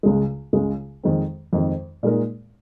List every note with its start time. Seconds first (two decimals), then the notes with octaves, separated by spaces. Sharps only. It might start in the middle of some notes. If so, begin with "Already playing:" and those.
0.03 C#2 C#3 G#3
0.53 C#2 C#3 G#3
1.03 F2 D#3 G#3 C4
1.53 F2 D#3 G#3 C4
2.03 A#2 G#3 D#4 A#4